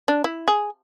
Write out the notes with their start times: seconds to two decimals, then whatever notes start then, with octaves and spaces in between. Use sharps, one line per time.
0.08 D4
0.24 E4
0.48 G#4